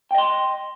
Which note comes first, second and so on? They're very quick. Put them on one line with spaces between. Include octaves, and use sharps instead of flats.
G5 D#5 C6